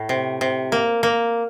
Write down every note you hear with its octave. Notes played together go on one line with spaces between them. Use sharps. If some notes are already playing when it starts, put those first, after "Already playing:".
Already playing: A2
C3
C3
A#3
A#3